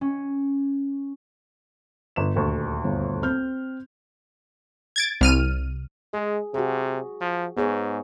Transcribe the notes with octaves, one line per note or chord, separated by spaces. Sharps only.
C#4
G1 E7
D#1 D2 C#6
G1
C4 F6 G6
G#6 A6 D7
C2 F6 D#7
G#3 G#4
C3 F#4 G#4
F3
G#2 B3 G#4 C#5